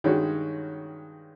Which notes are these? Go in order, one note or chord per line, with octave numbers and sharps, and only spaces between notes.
G2 D#3 G#3 C#4 F#4